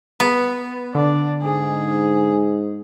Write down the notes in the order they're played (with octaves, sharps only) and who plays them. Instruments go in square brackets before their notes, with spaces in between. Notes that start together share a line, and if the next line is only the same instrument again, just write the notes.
[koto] B3
[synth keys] D3 [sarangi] D4
[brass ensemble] G#2 [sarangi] G#4